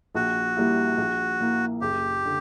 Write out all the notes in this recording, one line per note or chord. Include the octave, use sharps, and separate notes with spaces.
A#1 F#4
A#2 G3 A#3 E4
A#1
A#2 A#3 E4
F#1 G4
D3